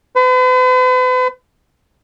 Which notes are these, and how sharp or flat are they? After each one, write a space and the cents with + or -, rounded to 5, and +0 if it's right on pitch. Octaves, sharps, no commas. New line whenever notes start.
B4 +45